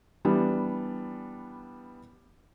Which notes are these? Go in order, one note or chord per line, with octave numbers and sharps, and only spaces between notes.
E3 G3 B3 D4